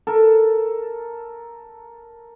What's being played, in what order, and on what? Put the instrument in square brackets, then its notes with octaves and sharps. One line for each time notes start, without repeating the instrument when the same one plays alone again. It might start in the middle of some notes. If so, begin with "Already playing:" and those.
[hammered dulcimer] A4 A#4